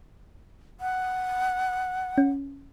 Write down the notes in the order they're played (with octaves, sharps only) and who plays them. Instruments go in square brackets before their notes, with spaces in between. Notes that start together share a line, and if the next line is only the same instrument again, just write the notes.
[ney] F#5
[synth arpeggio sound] C#4